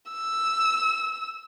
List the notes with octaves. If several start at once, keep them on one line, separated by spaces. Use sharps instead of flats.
E6